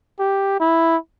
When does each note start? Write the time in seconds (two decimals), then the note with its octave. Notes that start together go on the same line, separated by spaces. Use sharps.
0.19 G4
0.60 E4